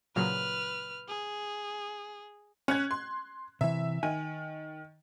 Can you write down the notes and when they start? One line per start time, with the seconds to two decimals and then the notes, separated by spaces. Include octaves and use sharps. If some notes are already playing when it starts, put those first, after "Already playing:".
0.16 A#2 C#3 F#3 B4 F6
1.08 G#4
2.68 C#4 F#6 G#6
2.91 C6
3.61 C3 E3 E5
4.03 D#3 G#5